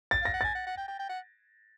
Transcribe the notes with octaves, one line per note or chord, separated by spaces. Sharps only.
A6
F5 A#6
F#5
G#5 A6
F#5
F#5
G5
G5
G5
F#5